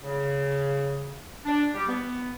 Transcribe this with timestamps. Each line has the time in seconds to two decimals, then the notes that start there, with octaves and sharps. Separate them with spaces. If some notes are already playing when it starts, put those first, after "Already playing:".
0.03 C#3
1.46 D4
1.74 G3 G4
1.88 B3